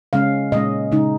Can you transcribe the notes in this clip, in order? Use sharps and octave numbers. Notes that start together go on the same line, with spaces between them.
C#3 G#3 C#4 F5
A#2 G#3 C#4 D#5
C#3 G#3 D#4